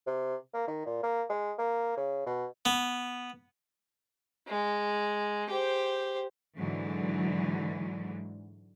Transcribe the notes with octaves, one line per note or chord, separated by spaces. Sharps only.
C3
A#3
D#3
A#2
A#3
G#3
A#3
C#3
B2
B3
G#3
G4 C5
G#2 D3 E3 F#3